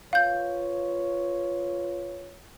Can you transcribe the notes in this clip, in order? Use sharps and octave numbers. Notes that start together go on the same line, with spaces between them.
F4 B4 C#5 F5 G6